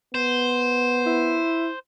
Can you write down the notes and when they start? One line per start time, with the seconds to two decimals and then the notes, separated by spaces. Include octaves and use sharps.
0.15 B3 C5
1.06 E4